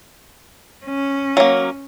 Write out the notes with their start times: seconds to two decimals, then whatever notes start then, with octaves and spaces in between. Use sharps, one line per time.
0.85 C#4
1.37 F#3 A#3